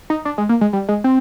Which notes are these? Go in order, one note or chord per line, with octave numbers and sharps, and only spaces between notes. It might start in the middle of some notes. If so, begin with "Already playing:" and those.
D#4
D4
G#3
A#3
G#3
G3
G#3
C4